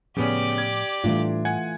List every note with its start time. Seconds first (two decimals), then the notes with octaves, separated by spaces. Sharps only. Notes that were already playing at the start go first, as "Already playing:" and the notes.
0.17 A2 C#3 F3 B3 C#4 G4 D5
0.58 G#6
1.04 A2 E3 G3 A3 D4 F4
1.45 F#5 G#5 G#6